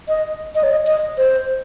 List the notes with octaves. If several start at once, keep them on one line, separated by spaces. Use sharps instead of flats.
D#5
D#5
C#5
D#5
D#5
C5